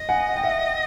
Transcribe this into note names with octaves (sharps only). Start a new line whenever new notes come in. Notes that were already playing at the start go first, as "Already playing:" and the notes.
Already playing: D#5
F#5 G#5
F#5
G5
E5 F#5